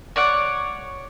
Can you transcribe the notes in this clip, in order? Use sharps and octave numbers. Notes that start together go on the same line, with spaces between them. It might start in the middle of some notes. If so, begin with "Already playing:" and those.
C#5 D5 F#5